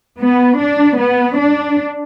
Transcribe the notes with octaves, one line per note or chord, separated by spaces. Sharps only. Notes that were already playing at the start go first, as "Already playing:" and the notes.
B3
D4
B3
D4